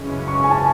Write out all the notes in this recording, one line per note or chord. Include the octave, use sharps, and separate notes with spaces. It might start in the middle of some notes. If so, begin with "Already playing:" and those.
Already playing: F#2 C#3 E3 G#3 C#4
C#6
G#5
A5